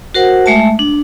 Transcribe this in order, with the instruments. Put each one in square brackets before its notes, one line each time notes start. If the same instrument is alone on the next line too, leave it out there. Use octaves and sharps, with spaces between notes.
[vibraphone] F#4 A#4 C5 F#5
G#3 A3 E5 A5
D4